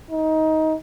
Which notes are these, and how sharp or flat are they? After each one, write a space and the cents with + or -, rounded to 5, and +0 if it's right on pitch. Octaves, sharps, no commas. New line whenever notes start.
D#4 +20